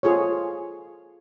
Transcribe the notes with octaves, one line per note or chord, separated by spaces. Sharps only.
F4 G#4 A4 C#5